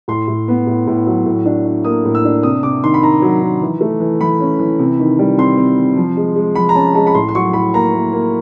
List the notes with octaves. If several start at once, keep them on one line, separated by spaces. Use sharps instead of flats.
A2 C6
A2
B3
A2
A2
F#3
A2
D4
D4
A#3 D#6
A2
E6
D4
C3 D#6
C3 D6
D#3 C6
B5
D#3 A#5
F#3
D#3
E3
A3
E3
E3 B5
C#4
E3
C3
D#3
G3
C4 C6
C4
C3
F3
G#3
G#3
F3 B5
A#5
C#4 A5
G#3 A5
B5
A2 C6
C6
F#3 C#6
A2 B5
A#3 A#5
A#3
A#3